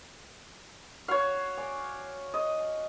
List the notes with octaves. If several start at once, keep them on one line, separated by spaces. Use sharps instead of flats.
F#4 C#5 F5
D5 G#5
D#5